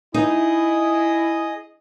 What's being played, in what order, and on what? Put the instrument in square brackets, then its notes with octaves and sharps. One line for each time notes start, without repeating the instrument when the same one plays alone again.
[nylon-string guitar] D#4 [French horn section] E4 [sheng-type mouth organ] G#4 D#5 D#6